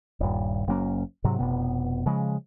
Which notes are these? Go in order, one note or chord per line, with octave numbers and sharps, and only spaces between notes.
D#1 G2
F#1 F#3 A#3 C#4
G#2 C3 F#3
F1 B2 B3
C#3 F3 G#3